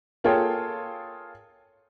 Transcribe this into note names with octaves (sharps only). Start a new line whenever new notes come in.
A#3 F4 G#4 A4 C#5 G5